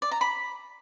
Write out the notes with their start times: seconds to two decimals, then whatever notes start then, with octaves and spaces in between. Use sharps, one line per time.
0.02 D5
0.11 A#5
0.21 B5